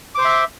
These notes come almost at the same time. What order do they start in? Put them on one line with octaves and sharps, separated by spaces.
D6 C5 C6 E5